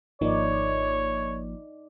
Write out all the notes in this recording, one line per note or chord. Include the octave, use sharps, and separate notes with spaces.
G#1 F3 A#3 D#4 C#5 D5